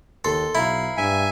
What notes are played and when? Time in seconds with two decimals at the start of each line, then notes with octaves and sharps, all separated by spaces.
0.25 D#2 A4 C6
0.55 B1 E4 F5 A#5 B5
0.97 G2 E5 G#5